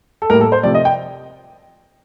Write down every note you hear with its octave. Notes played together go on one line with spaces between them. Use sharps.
A4
A2 G3 A#3 A#4
A4
C5
C3 F3 A3 D5
D#5
G5